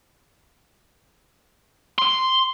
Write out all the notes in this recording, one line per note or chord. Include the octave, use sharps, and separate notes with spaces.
C6